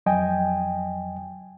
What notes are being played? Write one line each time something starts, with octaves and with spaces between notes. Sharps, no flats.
F2 F#3 D#5 G5 G#5